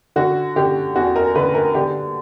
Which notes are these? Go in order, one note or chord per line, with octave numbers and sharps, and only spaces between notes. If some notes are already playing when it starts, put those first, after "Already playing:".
D3 F#4
D3 G4
E2 F#4
A#4
D3 B4
A#4
D3 G4